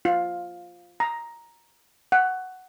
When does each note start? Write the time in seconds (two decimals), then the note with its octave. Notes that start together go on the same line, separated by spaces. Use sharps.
0.05 F4
1.00 A#5
2.12 F#5